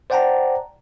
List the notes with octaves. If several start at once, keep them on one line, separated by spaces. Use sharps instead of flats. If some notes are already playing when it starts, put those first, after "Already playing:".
C5 D5 F#5 G5 A5 A#5